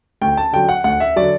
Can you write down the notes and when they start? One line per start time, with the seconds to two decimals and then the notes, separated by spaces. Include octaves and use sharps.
0.21 D2 G5
0.37 A5
0.53 D3 F#3 G5
0.69 F#5
0.84 D2 F#5
1.00 E5
1.16 D3 F#3 D5